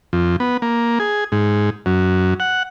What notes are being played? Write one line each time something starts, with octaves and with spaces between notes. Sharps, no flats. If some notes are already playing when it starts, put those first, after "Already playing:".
F2
B3
A#3
G#4
G#2
F#2
F#5